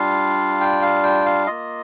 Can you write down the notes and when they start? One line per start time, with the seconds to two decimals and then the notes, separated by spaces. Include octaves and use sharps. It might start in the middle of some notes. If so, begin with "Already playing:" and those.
Already playing: G3 D4 F4 F5
0.61 G5
0.82 F5
1.03 G5
1.26 F5
1.47 A#3 F4 D#5